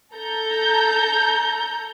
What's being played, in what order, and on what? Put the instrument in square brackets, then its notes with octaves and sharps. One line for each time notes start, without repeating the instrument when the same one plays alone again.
[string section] A4 A#5 G6